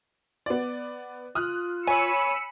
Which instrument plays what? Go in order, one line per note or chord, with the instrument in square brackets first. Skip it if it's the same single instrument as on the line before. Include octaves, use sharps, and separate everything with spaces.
[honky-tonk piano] B3 D5
[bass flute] F4 [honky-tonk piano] D#6 F6 F#6
[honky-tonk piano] C#5 [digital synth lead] G#5 [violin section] B5 E6 C#7